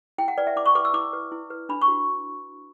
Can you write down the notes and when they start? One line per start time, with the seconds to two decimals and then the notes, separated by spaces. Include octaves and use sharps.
0.18 E4 G5
0.28 F#5
0.38 B4 D5
0.47 E5
0.56 E4 D6
0.66 C#6
0.75 B4 D6
0.85 E6
0.94 E4 D6
1.13 B4
1.32 E4
1.50 B4
1.69 D4 B5
1.82 C#6
1.88 F#4